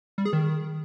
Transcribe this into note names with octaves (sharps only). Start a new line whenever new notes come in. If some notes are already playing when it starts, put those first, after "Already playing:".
G3
G#4
D#3